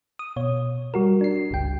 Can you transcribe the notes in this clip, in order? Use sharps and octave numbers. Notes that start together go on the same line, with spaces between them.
D#6
B2 C#5
G3 F#4 A#4
D4 C7
G1 C#2 G5